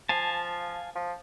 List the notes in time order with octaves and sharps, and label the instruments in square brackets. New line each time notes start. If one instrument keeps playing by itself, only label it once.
[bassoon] F3 [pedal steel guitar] F5 G#5 A5
[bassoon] F3